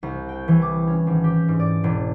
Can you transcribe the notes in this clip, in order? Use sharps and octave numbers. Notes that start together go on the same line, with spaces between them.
C2
G5
E3
D6
C#4
G#1
G4
G#2
D5
E1